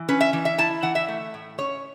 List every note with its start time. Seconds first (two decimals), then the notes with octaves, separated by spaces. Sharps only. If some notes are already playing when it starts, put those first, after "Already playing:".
Already playing: E3
0.09 C#4 B4
0.21 E5
0.33 E3
0.45 E5
0.58 E4 A5
0.83 E3 F#5
0.95 E5
1.08 A3
1.34 A2
1.58 C#4 C#5